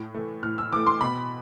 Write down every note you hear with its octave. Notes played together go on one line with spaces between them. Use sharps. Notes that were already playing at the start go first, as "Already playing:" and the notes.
Already playing: A2
E3 A3
A2 F6
E6
E3 A3 D6
C6
B2 B5